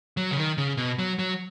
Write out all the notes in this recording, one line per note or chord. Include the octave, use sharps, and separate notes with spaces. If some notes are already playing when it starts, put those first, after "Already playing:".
F#3
C#3
D#3
C#3
B2
F#3
F#3